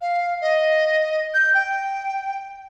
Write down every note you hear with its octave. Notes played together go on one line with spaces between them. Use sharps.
F5
D#5
G6
G5